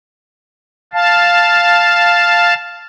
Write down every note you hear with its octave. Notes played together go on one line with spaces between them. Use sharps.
F5 A5